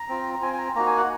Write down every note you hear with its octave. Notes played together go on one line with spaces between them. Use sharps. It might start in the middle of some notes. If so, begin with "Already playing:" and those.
Already playing: A#5
C4 F4
A#5
C4 F4 G#5
G#5
A#5
A#3 D#4 F#4 A#5
G#5
F#5